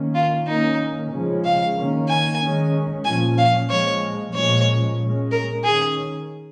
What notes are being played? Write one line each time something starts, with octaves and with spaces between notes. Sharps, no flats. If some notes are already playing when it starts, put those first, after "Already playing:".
Already playing: D#3 A#3 C#4
F4
D#3 A#3 C#4 D#4
C#3 F3 G#3 C#4
F5
D#3 A#3 C#4
G#5
D#3 G#3 C#4
A#2 F3 C#4 G#5
F5
A#2 F3 G#3 C#5
A#2 F3 G#3 C#4 C#5
A#2 G#3 C#4
A#4
D#3 C#4 G#4